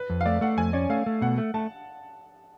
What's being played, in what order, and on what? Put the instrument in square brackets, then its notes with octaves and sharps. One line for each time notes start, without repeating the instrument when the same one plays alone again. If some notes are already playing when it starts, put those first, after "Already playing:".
Already playing: [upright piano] B4
[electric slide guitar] F2
[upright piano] F5
[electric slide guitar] A3 [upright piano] D5
[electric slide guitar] A3 [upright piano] F#5
[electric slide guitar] F2 [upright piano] G#5
[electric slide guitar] C#4 [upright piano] D5
[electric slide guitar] A3 [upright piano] F5
[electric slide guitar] A3
[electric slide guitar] B2 [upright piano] F#5
[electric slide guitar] A3
[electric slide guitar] A3 [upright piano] A5